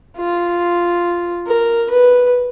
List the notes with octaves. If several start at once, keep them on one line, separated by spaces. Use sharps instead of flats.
F4
A#4
B4